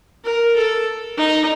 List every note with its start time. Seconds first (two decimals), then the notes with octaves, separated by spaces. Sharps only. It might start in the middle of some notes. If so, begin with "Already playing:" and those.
0.24 A#4
0.56 A4
1.18 D#4